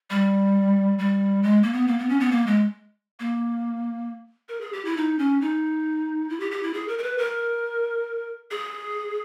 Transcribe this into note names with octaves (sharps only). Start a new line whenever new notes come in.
G3
G3
G#3
A#3
B3
A#3
B3
C#4
B3
A#3
G#3
A#3
A#4
G#4
G4
E4
D#4
C#4
D#4
E4
G4
G4
E4
G#4
A#4
A#4
B4
A#4
G#4